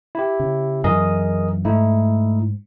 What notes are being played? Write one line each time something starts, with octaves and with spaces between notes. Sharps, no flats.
E4 G4
C#3
F#2 E3 G#4 A#4 D#5
G#2 A3 D#4 E4